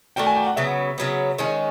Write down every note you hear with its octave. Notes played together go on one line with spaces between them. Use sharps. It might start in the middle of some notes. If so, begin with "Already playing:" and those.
A3 D4 F#4 A#4 G5
G#5
G5
F#5
C#3 F#3 B3 E5
C#3 F#3 B3
D#3 G#3 C#4